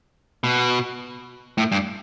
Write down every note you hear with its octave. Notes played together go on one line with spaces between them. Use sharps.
B2
A2
G2